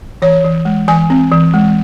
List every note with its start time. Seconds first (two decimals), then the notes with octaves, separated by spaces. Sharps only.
0.22 E3 C#5
0.44 E3
0.65 G#3
0.88 E3 G#5
1.10 C4
1.32 E3
1.54 G#3